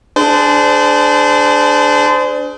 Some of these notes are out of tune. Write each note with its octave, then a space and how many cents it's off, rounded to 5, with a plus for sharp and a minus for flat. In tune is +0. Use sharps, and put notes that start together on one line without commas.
D4 +0 G#4 +25 C5 -30